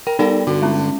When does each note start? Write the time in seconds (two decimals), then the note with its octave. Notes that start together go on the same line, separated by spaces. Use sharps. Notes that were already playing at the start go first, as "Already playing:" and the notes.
0.07 A#4 G5
0.19 G3 B3 D#4 A4 A#4 D5
0.47 G2 D3 F#4
0.62 G#3 C#4